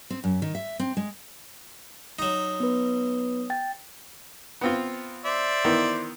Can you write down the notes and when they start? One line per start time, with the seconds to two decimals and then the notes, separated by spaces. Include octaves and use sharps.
0.10 C4
0.24 F#2
0.42 D#3
0.55 E5
0.80 C4
0.97 G#3
2.19 F#3 D#4
2.60 B3 B4
3.50 G5 A6
4.61 B3 C4 F4
5.25 C5 D5 E5
5.65 D#3 E3 B3